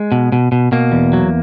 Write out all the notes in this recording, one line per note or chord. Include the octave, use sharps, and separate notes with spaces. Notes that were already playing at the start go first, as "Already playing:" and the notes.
Already playing: G#3
B2
B2
B2
B2 A#3
E2
F#3